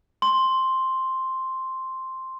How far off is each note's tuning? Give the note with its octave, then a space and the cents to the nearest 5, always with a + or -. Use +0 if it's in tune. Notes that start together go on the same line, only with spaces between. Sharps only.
C6 +5